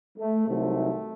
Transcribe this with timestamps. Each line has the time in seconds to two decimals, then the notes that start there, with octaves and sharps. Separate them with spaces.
0.17 A3
0.48 C2 C3 D#3 F#3 A3